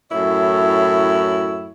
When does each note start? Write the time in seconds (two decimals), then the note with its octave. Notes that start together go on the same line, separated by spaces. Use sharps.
0.12 F#2 A2 E4 C#5